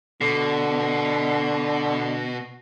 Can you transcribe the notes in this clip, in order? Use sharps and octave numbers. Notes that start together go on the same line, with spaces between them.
B2 D3